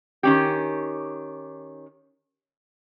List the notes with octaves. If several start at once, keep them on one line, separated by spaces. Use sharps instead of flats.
D#3 C#4 G4